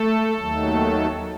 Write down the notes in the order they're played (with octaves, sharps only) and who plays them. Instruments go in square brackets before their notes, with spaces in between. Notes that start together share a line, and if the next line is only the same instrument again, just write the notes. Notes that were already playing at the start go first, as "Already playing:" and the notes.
Already playing: [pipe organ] A3 A4
D#2 D#3 F#3 A3